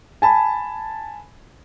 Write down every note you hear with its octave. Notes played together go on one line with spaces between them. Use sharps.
G#5 A5 B5